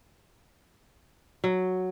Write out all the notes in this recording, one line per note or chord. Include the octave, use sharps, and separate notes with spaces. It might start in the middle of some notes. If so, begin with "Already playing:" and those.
F#3